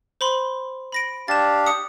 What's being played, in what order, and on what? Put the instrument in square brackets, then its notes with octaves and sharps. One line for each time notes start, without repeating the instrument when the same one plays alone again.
[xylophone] C5 B5 C6
B5 A#6 D7
[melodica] D4 G4 F5 [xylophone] A6 E7
[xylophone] D#6 C#7